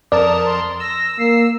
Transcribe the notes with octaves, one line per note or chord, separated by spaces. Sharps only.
F2 A#4 D5 A5 D#6
C6
E6 A#6
A#3 C7